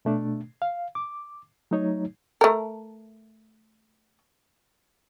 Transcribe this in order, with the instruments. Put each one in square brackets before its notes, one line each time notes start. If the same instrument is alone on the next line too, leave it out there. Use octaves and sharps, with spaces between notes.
[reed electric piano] B2 A3 D4
F5
D6
F#3 A3 D#4 C#5
[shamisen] A3 A#4